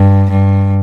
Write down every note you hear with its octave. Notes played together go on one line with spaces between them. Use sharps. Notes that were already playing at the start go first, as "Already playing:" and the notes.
Already playing: G2
G2